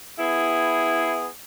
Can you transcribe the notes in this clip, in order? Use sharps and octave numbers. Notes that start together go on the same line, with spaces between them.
B3 E4 G#4